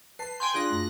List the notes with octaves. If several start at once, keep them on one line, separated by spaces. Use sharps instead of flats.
B4 A5 C7
G5 G#5 C6 G6
D4 F4 G#4 F#6 A#6
F#2 A3